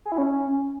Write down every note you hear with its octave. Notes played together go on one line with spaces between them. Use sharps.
G#4
E4
C#4